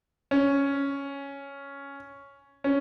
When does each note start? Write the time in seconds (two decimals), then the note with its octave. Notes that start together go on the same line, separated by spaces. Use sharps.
0.31 C#4
2.64 C#4